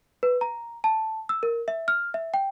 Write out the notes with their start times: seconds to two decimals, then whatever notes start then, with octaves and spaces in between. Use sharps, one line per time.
0.23 B4
0.41 A#5
0.84 A5
1.29 E6
1.43 A#4
1.68 E5
1.88 F6
2.14 E5
2.34 G5